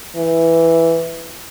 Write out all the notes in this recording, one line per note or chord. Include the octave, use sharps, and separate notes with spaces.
E3